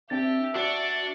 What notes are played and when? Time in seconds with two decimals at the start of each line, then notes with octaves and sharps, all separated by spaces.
0.10 C4 D4 G4 E5 A6
0.55 D4 F#4 D5 C#6